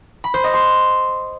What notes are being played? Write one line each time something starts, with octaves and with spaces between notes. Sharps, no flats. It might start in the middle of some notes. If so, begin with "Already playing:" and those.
B5
C5
D#5
C6